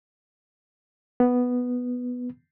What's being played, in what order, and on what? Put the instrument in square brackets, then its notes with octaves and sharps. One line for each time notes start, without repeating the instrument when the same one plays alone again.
[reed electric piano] B3